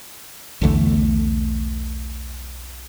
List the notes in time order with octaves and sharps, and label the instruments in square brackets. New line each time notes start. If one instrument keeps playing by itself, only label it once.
[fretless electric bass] B1 E2 D3 A3